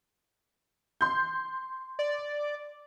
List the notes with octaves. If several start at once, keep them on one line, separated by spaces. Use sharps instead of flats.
C6 G6
D5